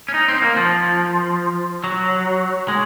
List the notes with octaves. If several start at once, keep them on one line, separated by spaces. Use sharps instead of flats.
C#4
D#4
C4
A#3
F3
F#3
G#3